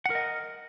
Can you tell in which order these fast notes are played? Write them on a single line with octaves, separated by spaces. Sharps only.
F#5 A#4 D#5